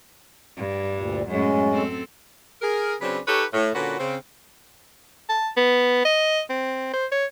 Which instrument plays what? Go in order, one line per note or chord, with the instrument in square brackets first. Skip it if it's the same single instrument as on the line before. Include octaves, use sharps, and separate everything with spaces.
[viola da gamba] G2
[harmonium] D2 A#2 G3
[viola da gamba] F#2 A2 [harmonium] G#3 C#4
[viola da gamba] C4 A4
[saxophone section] G#4 A#4
C#3 F#3 C4 D4 G#4 B4
D#4 G4 A4 B4 C#5
A2
A#2 D3 C#4 F#4 B4
C#3 C4
[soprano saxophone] A5
B3
D#5
C4
C5
C#5